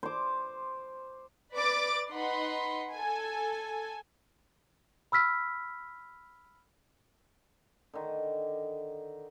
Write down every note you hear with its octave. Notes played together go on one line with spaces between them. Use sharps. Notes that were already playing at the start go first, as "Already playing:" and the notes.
C5 D6
B4 D5 D6 A6
D#4 B4 F#5 B5 C6
A4 G#5
B5 E6 F6 B6
D3 D#3